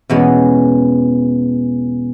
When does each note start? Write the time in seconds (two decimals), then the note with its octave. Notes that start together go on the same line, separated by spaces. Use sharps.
0.10 E2 B2 G#3 C#4